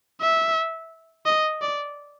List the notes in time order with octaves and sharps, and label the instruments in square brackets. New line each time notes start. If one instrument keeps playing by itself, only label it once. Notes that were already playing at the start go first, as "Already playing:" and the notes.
[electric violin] E5
D#5
D5